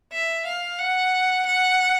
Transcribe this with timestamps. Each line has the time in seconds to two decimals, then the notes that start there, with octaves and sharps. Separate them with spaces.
0.12 E5
0.46 F5
0.79 F#5
1.46 F#5